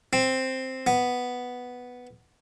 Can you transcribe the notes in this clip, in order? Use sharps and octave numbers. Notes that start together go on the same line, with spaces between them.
C4
B3